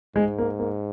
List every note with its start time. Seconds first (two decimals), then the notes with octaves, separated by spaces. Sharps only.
0.16 G#2 G#3
0.38 A#3
0.59 A#3